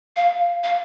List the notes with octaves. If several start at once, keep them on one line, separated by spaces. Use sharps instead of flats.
F5
F5